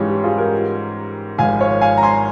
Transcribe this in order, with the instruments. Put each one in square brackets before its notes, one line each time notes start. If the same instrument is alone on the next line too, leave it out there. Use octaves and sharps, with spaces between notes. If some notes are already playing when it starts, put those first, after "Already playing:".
Already playing: [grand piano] G#2 E3 G3 C#4 [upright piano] F4 G#4
[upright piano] G4
F4 G#4
G4 A#4
[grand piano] G#1 G#2 F3 G#3 [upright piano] F5 G#5
[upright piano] C#5 F5
F5 G#5
A#5
G#5 C6